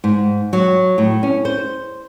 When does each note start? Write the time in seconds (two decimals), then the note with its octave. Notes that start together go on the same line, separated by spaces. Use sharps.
0.04 G#2
0.53 F#3
0.98 A2
1.23 C#4
1.45 C5